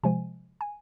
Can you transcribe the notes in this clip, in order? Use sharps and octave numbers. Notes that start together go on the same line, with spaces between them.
C3 F3 G#3 G#5
G#5